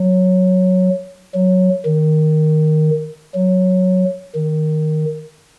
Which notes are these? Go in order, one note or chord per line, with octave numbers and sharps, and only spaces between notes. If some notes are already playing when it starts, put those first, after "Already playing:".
Already playing: F#3
F#3
D#3
F#3
D#3